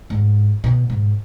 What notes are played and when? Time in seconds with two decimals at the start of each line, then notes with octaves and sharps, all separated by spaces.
0.10 G#2
0.64 B2
0.90 G#2